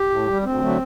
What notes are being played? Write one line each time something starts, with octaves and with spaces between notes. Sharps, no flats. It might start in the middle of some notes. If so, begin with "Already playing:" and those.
Already playing: G4
A2
G3
D2 C4
D3 F#3 A3